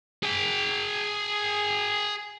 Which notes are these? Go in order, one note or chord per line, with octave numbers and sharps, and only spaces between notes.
G#4 G5